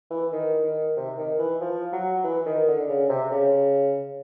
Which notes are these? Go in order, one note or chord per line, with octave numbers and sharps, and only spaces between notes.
E3
D#3
D#3
C3
D#3
E3
F3
F#3
E3
D#3
D3
C#3
C3
C#3